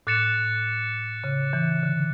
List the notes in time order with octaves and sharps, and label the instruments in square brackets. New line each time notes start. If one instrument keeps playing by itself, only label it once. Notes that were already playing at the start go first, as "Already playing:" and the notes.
[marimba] A2 [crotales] D6 F#6 A6 C#7 E7
[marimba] C#3
E3
D3